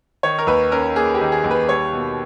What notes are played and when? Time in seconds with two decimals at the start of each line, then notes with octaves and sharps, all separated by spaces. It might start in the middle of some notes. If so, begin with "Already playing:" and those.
0.23 D#3 C#5
0.38 A#4
0.47 D#2 B4
0.72 C#4 A#4
0.96 A#3 G#4
1.14 G4
1.21 D#3
1.32 G#4
1.44 D#2
1.51 B4
1.68 G3 C#5
1.93 B2